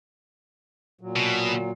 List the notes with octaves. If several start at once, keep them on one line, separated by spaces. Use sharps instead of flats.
A#2 F#3
B2